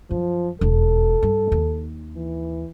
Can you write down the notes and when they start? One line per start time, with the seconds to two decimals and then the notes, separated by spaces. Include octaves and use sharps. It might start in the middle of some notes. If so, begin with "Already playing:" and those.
0.11 F#2 F3
0.61 E1 F2 A4
1.23 G2
1.52 D#2 D#4
2.16 E3